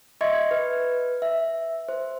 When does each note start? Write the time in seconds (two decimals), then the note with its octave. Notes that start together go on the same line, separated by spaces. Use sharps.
0.21 D#5 E5 C6 C#6 G#6 C#7
0.51 B4
1.22 E5
1.89 C5